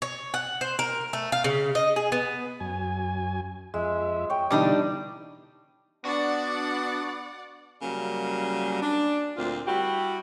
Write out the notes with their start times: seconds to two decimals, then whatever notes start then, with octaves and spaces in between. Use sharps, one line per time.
0.02 C#5
0.34 F#5
0.61 C5
0.79 A#4
1.13 A3
1.32 F5
1.44 C#3
1.75 D#5
1.96 G#4
2.12 B3
2.60 F#2 G#5
3.74 F2 G#3 E5
4.30 C#5 G5
4.51 B2 D3 E3 G3 D4 D#4
6.05 B3 D4 F#4 D5 F#5
7.82 C#3 F#3 G3 A#3
8.82 D4
9.37 D2 A#2 C4 F4
9.67 G3 E4 F#4 G4